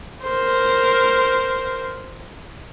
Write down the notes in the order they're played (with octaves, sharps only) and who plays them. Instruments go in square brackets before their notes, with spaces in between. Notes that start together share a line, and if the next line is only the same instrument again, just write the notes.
[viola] A#4 C5